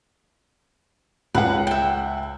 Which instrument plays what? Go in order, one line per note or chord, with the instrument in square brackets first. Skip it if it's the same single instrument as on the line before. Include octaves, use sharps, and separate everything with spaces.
[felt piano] C#2 F#5 [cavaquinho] B4
[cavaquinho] E5 G5